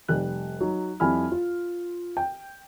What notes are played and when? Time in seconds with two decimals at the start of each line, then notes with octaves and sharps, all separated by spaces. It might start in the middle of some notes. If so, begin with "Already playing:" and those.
0.08 F1 G3 F#6
0.60 F#3 D#4
1.00 F2 G3 E4 G#5 B5 F6
1.31 F4
2.17 G5